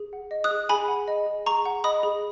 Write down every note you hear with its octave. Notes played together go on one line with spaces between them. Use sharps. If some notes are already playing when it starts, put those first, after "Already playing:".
Already playing: G#4
F#5
D#5
D#6 F#6
G#4
G#4 G#5 B5
F#5
D#5
G#4
G#4 A#5 C#6
F#5
D#5 B5 D#6
G#4